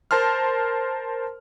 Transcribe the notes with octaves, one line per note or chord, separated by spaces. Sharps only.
A#4 C5 A5 C6 F6